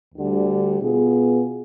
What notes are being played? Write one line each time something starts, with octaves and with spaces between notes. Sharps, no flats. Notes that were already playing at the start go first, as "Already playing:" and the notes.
D2 D3 G3
B2 B3 F4 G#4